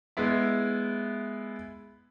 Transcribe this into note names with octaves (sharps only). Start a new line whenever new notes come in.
G#3 B3 E4